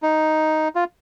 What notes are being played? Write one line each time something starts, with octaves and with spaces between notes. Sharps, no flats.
D#4
F4